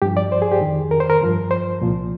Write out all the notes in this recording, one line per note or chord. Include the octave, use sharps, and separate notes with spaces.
G2 F3 G4
D5
C5
G#4
G4
F2 D#3
A#4
C5
A#4
G2 F3
C5
C2 A#2 F3